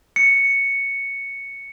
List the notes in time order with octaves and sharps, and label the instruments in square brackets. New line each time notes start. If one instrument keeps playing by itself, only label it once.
[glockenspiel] C#7